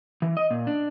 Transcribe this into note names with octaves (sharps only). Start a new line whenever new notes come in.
E3
D#5
A#2
D4